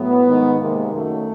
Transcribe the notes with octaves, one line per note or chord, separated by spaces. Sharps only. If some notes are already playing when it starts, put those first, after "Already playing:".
Already playing: A2 F#3 A3 B3
G#2 D#3 G#3
C3 D#3 G#3 A#3
F#2 D#3 F#3 A3